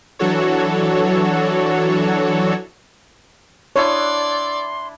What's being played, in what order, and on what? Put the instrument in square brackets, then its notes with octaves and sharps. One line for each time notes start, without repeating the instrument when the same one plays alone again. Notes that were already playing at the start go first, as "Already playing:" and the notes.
[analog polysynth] E3 F#3 D4 F#4 A4 C#5
[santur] D4 E4 D#6 [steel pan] C#5 [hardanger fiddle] D5 [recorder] C6